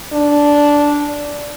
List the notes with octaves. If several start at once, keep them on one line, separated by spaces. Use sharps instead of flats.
D4